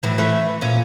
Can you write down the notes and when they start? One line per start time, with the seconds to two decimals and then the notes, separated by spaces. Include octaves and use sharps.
0.03 A2 E3 F#3
0.18 E3 A3 C#4
0.61 A#2 C#4